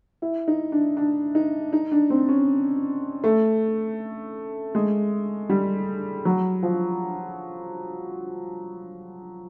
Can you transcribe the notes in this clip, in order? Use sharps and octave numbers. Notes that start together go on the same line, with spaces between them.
E4
D#4
D4
D4
D#4
D#4
D4
C4
C#4
A3
G#3
G3
F#3
F3